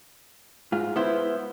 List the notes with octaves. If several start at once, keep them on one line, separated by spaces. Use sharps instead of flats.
G#2 F4
B3 E4 C5